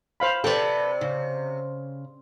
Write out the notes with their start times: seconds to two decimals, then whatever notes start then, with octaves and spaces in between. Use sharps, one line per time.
0.20 C5 F5 B5
0.44 C3 A4 B4 D5 G5
1.01 C#3